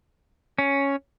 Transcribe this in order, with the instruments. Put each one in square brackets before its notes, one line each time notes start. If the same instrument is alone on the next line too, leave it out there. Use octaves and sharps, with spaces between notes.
[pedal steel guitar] C#4